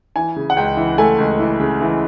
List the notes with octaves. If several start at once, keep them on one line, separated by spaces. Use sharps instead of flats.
E3 G#5
C#3
F#5
C#2 G5
E3
A3 G#5
C#2
E3
C#3
E3